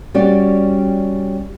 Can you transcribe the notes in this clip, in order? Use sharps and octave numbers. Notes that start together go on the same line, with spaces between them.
G3 C#4 F#4 G4 D5